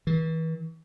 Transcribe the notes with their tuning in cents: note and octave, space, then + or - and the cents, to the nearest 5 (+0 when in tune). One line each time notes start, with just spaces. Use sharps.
E3 -35